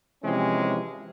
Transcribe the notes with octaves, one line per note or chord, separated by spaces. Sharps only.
C3 E3 F3 G#3 C#4 G4